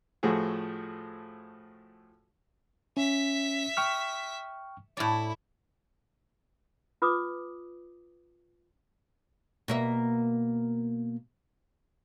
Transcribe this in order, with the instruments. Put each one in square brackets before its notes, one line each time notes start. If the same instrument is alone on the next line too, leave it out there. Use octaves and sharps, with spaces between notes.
[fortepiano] A2 F3 A3 F#4 G#4
[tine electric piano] C#4 [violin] E5 B6
[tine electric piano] G5 C#6 F6
[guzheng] A2 D5 [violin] E4
[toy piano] F4 B4 D6 D#6
[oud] B2 A#3 E5